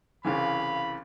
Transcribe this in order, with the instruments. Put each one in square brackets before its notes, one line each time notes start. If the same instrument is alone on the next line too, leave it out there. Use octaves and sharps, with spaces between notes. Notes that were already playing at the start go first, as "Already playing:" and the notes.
[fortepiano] C2 C#3 E3 [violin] F5 [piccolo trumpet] B5